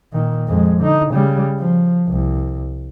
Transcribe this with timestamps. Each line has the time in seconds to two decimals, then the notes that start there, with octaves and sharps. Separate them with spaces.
0.13 A#2 D#3
0.48 F2 G#3
0.81 D3 D#4
1.11 C#3 G3
1.59 F3
2.08 C2